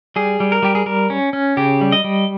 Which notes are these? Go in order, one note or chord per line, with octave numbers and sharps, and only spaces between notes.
G3 G#4
G3
A#4
G3 G4
G#4
G3 A#4
C#4
C#4
C#3 G4
G3
D#5
G3